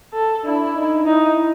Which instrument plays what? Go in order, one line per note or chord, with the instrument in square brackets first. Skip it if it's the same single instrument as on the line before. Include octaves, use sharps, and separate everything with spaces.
[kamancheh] A4
[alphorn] D4 [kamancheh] E4
[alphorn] D#4
[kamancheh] D#4 [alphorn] E4